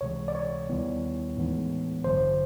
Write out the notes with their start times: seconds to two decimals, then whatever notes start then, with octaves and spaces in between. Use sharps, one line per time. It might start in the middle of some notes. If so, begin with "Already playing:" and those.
0.01 C#2 C3 E3 G#3 C#5
0.28 D5
0.35 C#5
0.69 D#2 D#3 G3 B3 E4
1.37 A2 E3 G#3 B3 D#4
2.04 A1 G2 D3 F#3 C5